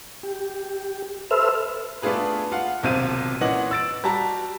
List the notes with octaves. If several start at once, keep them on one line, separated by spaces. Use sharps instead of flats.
G4
A4 B4 C5 E5 E6 F6
A3 B3 D4 F4 G#4 B4
F4 F5 F#5
D#1 B1 C3 C5 F5 D#7
A#2 E3 C#4 D#5 F#5 F#7
E6 A6 D7
G3 F#4 A5 A#5